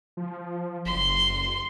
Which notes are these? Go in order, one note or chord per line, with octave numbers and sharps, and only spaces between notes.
F3
F#1 C6